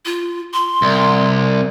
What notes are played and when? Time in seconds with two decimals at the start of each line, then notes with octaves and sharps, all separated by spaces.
0.06 F4
0.53 C6
0.82 C2